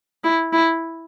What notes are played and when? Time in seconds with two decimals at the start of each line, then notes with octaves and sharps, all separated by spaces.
0.24 E4
0.53 E4